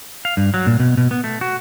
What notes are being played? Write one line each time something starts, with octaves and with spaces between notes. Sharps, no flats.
F5
G2
F#3
A#2
B2
B2
B3
A3
F#4